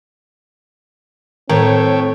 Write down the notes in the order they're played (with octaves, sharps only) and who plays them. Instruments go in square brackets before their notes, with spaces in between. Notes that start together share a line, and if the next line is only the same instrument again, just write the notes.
[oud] A2 [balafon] D#3 [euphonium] C4 [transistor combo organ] A4 C#5 G5